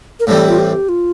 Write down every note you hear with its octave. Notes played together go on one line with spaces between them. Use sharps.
A#4
A2 E3 G3 C4 A4
F4
G4
F4